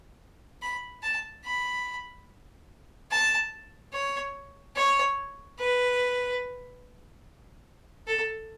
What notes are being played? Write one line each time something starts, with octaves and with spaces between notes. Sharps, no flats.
B5
A5
B5
A5
C#5
C#5
B4
A4